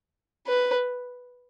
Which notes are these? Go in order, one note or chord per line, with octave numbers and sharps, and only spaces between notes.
B4